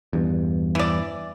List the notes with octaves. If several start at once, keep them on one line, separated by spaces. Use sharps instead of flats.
E2 G2
E3 D5